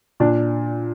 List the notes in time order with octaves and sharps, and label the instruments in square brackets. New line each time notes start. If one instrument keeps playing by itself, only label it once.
[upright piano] A#2 D4